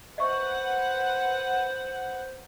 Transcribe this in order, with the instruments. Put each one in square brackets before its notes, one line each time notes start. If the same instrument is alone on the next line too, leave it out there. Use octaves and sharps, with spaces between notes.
[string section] B4 F#5 [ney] C5 [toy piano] D#5 E5 C#6